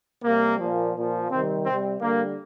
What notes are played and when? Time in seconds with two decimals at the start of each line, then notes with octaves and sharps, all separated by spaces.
0.24 C3 G3 A#3
0.60 A#2 F3
0.95 A#2 F3
1.30 C3 D#3 G3 C4
1.65 C3 G3 C4
2.01 D3 G3 A#3